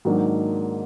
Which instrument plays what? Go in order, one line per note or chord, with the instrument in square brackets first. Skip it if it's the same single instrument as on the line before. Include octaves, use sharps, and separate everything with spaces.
[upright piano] G#2 D#3 F#3 A#3 D4